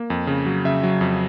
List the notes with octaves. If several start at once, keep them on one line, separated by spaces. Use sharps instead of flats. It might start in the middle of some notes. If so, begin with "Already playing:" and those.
Already playing: A#3
F2
C#3
F#3
C#3 E5
F#3
F2